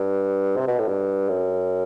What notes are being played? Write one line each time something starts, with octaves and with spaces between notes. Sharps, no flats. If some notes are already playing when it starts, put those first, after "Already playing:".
Already playing: G2
C3
B2
A2
G2
F#2